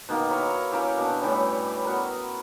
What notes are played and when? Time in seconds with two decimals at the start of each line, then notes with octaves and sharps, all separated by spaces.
0.09 B2 D#3 A#3
0.30 E4 A#4 C#5
0.71 A#3 C#4 E4 G4
0.97 B2 D4
1.22 A2 E3 G3 C#4
1.85 B3 F#4 A#4